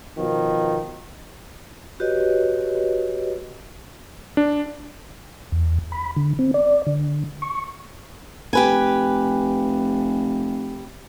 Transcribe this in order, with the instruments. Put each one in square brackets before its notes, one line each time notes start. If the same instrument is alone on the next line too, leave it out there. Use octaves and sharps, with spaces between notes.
[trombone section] B2 D#3 F3
[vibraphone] F#4 G4 B4 C#5 D#5
[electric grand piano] D4
[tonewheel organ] E2
B5
D3
C4
D5
D3
C#6
[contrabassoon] F1 [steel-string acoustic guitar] G4 B4 G#5